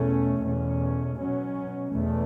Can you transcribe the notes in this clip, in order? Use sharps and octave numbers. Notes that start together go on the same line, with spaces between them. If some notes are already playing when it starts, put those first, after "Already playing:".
Already playing: E2 B2 A3 C#4
E2 B2 A3 C#4
B2 F#3 C#4
E2 B2 A3